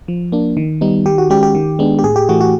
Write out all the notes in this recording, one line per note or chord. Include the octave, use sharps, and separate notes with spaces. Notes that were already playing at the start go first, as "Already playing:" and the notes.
F3
A#3 D4
D#3
G3 B3 D#4
D#3 G4
F#4
G#3 C#4 G4
G4
D#3
G#3 B3 D4
G4
A2 G#4
G4
E3 A3 F#4
F#4